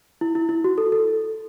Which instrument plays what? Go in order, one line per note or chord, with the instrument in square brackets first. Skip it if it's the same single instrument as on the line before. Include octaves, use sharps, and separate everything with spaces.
[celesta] E4
E4
E4
F#4
A4
A4